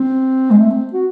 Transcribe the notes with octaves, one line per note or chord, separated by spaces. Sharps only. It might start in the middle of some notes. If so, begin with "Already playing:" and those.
Already playing: C4
G#3
A3
C4
F#4